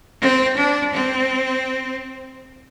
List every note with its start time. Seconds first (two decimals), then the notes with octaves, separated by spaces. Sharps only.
0.21 C4
0.57 D4
0.94 C4